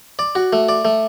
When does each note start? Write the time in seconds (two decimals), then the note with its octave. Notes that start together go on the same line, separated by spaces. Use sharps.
0.19 D5
0.35 F#4
0.53 A3
0.69 D5
0.85 A3